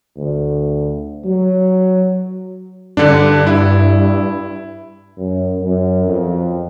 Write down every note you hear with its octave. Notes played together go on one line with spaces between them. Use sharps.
D2
F#3
G2 D3 D4
E4
F#2
F#2
F2